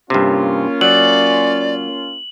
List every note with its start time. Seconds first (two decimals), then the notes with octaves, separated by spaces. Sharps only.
0.10 G2 C3 A#3 C#4 F4
0.81 F#3 D5 F#7